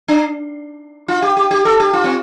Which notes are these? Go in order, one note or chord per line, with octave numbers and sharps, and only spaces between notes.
D4
F4
G4
G4
G4
A4
G4
F4
C4